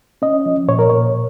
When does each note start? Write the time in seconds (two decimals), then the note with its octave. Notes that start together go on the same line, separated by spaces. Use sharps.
0.22 C#4 D#5
0.46 F3
0.68 A#2 C#5
0.79 A#4
0.90 A#2 C#5